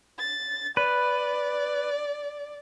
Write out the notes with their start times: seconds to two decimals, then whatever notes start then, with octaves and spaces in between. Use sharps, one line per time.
0.19 A6
0.77 B4 D5